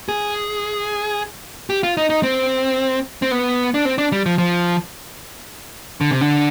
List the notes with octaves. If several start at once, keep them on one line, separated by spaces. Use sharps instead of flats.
G#4
G4
F4
D#4
D#4
C4
C4
B3
D4
C4
D4
G3
F3
F3
D3
C3
D3